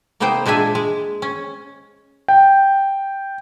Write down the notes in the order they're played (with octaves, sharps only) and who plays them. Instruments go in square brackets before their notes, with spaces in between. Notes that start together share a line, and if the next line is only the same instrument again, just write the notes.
[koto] C3 A#3 B3 D#4 C5 G5
A#2 G#3 D4 E5 G#5
G#3
C#4
[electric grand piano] G5